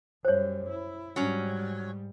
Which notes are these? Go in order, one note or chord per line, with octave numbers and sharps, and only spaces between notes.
F#2 G3 C5 C#5
E4
G#2 F#3 G3 C#4